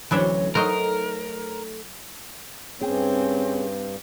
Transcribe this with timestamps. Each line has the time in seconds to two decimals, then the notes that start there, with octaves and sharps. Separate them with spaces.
0.11 D2 E3 F#3 C#4 D4 E5
0.55 F#3 A3 D#4 A#4 C5 D#5
2.81 G2 C4 C#4 G#4 G5